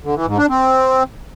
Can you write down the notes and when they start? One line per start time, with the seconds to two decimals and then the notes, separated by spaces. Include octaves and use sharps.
0.04 D3
0.15 E3
0.27 G#2
0.38 D4
0.49 C4